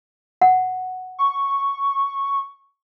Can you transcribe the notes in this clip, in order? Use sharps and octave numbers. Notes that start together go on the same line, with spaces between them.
F#5
C#6